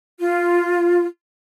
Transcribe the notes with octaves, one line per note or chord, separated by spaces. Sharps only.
F4